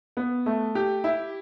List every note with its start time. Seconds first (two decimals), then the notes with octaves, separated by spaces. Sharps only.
0.17 B3
0.46 A3
0.75 G4
1.04 E4